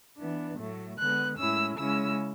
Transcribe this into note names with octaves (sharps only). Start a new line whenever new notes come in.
E3 B3 D4
A2 F#3 A3
D3 G#3 B3 F#6
A2 G#3 C#4 E4 E6
C#3 G#3 C#4 E4 E6